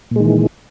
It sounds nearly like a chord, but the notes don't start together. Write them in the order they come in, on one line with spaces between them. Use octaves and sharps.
A#2 G#3 D#3 E3